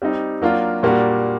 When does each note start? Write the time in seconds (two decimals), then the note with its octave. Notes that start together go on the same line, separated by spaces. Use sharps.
0.02 G3 C4 D#4
0.42 F#3 A#3 D4 F4
0.83 A#2 G3 A#3 D4 F#4